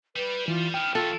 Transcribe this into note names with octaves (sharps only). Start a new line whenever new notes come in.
G3 G4 B4
E3 F4
D#3 B3 G5 F6
E3 C#4 F4 A4